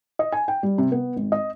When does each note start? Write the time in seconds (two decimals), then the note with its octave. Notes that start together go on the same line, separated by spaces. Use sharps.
0.19 D#5
0.32 G#5
0.48 G5
0.63 G3
0.78 C3
0.92 B3
1.16 G#1
1.32 D#5